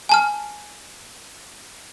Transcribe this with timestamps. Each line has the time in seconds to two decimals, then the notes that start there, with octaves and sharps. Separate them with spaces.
0.09 G#5 A5 F6